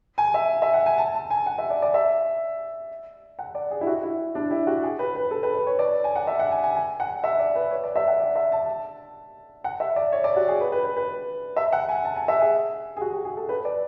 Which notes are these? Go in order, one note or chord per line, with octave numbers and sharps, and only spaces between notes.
G#5
E5
E5
F#5
G#5
A5
A5
G#5
F#5
E5
D5
D5
E5
F#5
D5
G#4
E4
F#4
E4
D4
E4
F#4
G#4
B4
B4
A4
B4
B4
C#5
D5
G#5
F#5
E5
F#5
G#5
G#5
G#5
F#5
E5
D5
B4
C#5
D5
E5
F#5
D5
E5
A5
F#5
E5
D5
C#5
D5
F#4
G#4
B4
B4
B4
B4
E5
F#5
G#5
A5
G#5
E5
G#4
G#4
F#4
F#4
G#4
A4
B4
D5